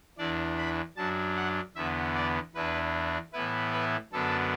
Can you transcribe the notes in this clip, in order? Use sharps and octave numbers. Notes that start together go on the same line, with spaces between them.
E2 E3 D4 D5
B5
F#2 F#3 D4 A5
F#5
E2 D3 B3 E5
D5
E2 E3 D4 B4
A2 E3 B3 E4 B4
B4
F#2 D3 B3 D4 A4